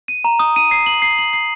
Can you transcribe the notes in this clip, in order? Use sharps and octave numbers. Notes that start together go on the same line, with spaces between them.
D#7
A#5
D#6
D#7
C7
F#7
C7
F#7
C7